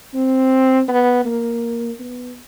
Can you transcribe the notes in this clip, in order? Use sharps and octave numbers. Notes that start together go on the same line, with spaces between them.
C4
B3
A#3
B3